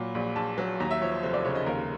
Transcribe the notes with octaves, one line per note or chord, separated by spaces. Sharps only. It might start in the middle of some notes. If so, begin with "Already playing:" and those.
Already playing: A#2 F#3 B5
A#1
A#1 A5
F#3
D#2 A#5
E5
F3 C#5
C5
F1 C5
D5
C#3 C#5
D#5
D#2 A#4